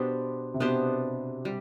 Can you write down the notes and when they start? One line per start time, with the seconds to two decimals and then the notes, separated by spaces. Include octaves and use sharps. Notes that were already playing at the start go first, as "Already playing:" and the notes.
Already playing: B2 B3 D4 G4 C5
0.54 C3
0.60 B2 B3 D4 G4 C5
1.45 G3